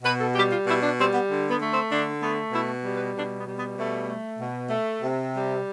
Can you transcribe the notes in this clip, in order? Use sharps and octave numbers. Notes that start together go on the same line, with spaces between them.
B2 B4
A4
G3 G4
F4
B2 E4
D4
G3 C4
B3
D3
B3
A3
C4
D3 D4
A3 B3
B2 E4
G3
B4
B2 D4
B3
G3
B3
B2 A3
A3
B2
A3
C3
G3